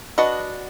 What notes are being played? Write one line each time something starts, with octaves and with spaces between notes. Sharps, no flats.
D4 F#4 B4 D#5